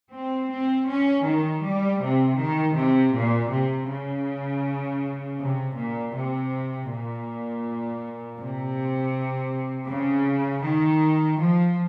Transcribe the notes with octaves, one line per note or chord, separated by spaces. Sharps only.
C4
C4
C#4
D#3
G3
C3
D#3
C3
A#2
C3
C#3
C3
A#2
C3
A#2
C3
C#3
D#3
F3